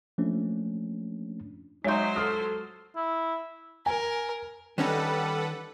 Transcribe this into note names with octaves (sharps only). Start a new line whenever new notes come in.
F3 A3 A#3 C#4 D4
F#3 G#3 D#4 C5 C#5 E5 C6 G6
A4 D#6 F6 C7
E4
A#4 G#5
D#3 G3 C#4 D#4 A4 B4 F#5